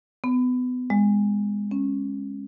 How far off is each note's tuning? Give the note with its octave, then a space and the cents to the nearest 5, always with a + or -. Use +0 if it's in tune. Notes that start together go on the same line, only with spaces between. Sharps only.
B3 +25
G#3 -20
C#4 -15